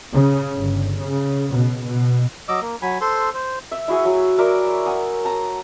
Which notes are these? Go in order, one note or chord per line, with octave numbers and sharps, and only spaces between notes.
C#3
G1
C#3
B2
B2
F#3 D#5 D6 E6
A#3
F#3 G#5 B5
A4 C5 C6
C5
E5
E4 F#4 G#4 G#5
F#3
A#4 D5 E5 C6
F#5 G#5 D#6
A5 A#5